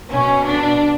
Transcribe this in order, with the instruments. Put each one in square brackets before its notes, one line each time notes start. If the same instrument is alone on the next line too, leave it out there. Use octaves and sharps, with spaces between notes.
[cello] B2 [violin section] C#4
[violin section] D4